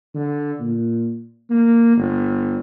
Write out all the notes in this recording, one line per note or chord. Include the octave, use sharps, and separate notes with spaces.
D3
A#2
A#3
G1